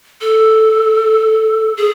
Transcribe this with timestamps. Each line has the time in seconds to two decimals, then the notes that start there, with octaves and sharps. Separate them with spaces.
0.21 A4
1.77 G#4